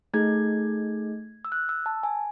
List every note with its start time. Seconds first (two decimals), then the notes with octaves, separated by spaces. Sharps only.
0.14 A3 D#4 G#4 G#6
1.45 E6
1.52 F#6
1.69 E6
1.86 A5
2.03 G#5